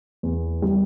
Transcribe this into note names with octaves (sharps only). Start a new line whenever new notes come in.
E2
G3